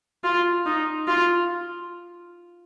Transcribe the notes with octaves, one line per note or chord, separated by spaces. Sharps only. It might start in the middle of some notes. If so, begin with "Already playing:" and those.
F4
D#4
F4